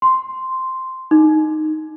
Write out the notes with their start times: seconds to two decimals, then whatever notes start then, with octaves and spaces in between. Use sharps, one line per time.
0.02 C6
1.11 D#4